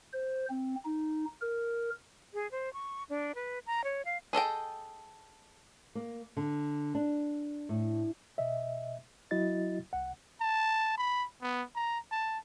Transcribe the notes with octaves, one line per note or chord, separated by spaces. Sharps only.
C5
C4
D#4
A#4
G#4
C5
C#6
D4
B4
A#5
C#5
F5
G#4 A4 D#5 G5
A#3
D3
D4
A2
B2 D#5 E5
F#3 E4 F#4 D#5 A6
C2 F#5
A5
B5
B3
A#5
A5